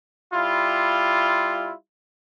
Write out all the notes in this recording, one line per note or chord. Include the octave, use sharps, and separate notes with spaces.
G3 E4 F4